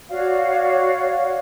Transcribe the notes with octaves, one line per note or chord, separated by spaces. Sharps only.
F#4 C#5 D5 F5